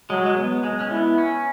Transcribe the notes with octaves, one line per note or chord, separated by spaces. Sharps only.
F#3 G#3
G#3
B3
G#3
C#4
B3 E4
C#4